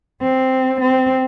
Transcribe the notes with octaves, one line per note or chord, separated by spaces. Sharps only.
C4
C4